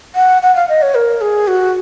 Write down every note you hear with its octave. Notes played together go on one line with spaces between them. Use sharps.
F#5
F#5
F5
D#5
C#5
A#4
G#4
F#4